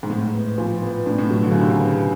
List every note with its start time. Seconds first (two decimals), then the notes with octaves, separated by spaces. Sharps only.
0.03 G#2
0.10 A2 G#3
0.34 B3
0.58 A#2 F3
0.82 B3
1.06 A2 D4
1.18 A2
1.30 B2 F#3
1.43 D3
1.51 C#3 D4
1.60 C3
1.70 C#3
1.79 B3